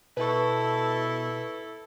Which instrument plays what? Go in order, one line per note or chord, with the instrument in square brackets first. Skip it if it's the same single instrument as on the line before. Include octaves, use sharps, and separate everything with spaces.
[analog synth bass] B2 [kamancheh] E4 A4 [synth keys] B4 C#6